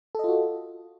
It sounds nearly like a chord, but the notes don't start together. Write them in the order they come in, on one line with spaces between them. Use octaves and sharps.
A4 D#5 F4 F#4